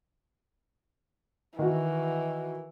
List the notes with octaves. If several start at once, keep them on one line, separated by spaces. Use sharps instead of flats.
D#3 E3 F#4